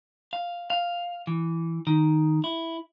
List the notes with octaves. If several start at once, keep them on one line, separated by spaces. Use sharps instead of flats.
F5
F5
E3
D#3
E4